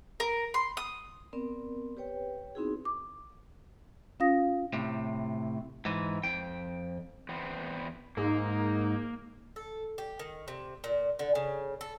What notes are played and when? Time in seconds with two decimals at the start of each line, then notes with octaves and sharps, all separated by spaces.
0.20 A#4
0.54 C6
0.77 D#6
1.33 B3 C4 A#4 D5
1.97 G4 B4 C#5 G5
2.55 B3 C4 D#4 E4 F#4 G#4
2.85 D6
4.20 C#4 F4 F5 D#6 A#6
4.73 A2 C3
5.85 G#2 E3
6.23 F2 G5
7.29 E2 B3 C4
8.17 G#2 A#3 D#4
9.56 A4
9.98 G4
10.20 D#3
10.48 C3
10.84 A#2
11.19 D3
11.35 C#3
11.81 A4